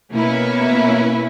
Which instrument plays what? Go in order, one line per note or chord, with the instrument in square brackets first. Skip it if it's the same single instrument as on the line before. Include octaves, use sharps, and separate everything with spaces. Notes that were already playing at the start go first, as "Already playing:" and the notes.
[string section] B2 A#3 C#4 E4 B4